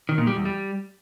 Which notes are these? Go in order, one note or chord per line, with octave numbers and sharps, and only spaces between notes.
D#3
A#2
G3
E2
G3